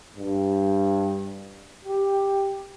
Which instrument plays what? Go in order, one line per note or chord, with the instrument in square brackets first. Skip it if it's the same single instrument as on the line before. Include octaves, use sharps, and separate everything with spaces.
[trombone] G2
G4